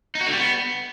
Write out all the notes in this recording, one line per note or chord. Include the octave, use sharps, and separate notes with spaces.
D#4
F#4
D3
G3
B3